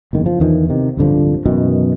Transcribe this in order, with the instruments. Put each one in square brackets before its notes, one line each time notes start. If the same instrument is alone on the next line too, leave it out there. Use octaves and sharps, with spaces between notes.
[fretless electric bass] F#1 E2 D#3
F3
E2 D#3 E3
C3 D#3
D1 G2 D3 F3
F#2 B2 D#3 E3